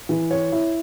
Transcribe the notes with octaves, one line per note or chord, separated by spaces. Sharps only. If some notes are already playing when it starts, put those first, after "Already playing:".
E3
C#5
E4